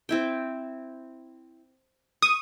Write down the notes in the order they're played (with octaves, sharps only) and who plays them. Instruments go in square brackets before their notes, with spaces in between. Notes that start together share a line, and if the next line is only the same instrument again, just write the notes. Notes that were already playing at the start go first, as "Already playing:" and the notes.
[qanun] C4 E4 G5
[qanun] C#6 [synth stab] D#6